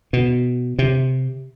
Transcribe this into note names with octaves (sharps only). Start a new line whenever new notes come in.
B2
C3